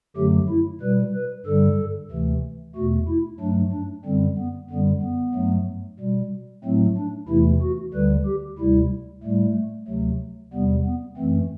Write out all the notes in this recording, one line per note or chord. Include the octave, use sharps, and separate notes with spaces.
F#2 D3 F#3 A3 G4
E4
B2 G3 B4
B4
G2 D3 G3 A4
D2 C3 E3 A3
E2 B2 A3 F#4
E4
G2 F#3 A3 D4
D4
F#2 D3 G3 C4
B3
F#2 D3 G3 B3
B3
G2 F#3 A3
B2 G3
A2 F#3 A3 C4
D4
E2 C3 E3 A3 E4
F#4
D2 D3 G3 B4
G4
D2 C3 G3 E4
A2 G3 A3
D2 C3 F#3 A3
E2 C3 G3 B3
B3
F#2 E3 A3 C4